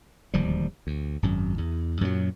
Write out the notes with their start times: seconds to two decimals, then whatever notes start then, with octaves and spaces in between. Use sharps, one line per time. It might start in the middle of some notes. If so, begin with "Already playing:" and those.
0.34 D1 D#2 F3 G3
0.87 D2
1.23 G#1 F#2
1.58 E2
2.01 F#2 A#2 F3 F#3